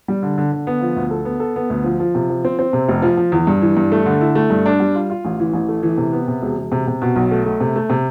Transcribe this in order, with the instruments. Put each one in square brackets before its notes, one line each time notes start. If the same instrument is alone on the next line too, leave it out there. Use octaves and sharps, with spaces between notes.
[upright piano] G3
D3
D3
D3
B3
F3
D2
A4
B3
A4
B3
D2
F3
F3
C3
F3
C4
C4
C3
F1
F3
F3
E2
G2
E3
G2
A3
D3
E4
A3
G2
D4
G3
F4
F4
A1
E3
A1
A3
E3
C3
B3
C3
E1
E1
C3
C3
B2
B1
A3
A3
C3
A3
C3